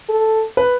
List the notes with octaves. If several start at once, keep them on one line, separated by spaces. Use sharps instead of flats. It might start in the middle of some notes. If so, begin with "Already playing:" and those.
A4
B4